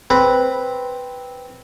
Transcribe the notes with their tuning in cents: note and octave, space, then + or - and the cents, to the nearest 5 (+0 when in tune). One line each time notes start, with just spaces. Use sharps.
C4 +0 B4 +0